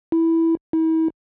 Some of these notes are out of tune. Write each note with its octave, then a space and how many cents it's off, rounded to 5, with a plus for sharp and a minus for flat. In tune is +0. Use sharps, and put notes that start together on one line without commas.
E4 -5
E4 -40